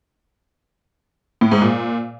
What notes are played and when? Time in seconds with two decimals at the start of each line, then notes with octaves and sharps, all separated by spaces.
1.41 A2
1.52 G#2
1.62 A#2